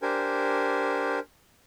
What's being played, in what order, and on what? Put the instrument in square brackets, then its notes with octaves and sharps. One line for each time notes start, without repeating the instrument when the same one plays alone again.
[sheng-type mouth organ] D4 G4 A#4 C5 G#5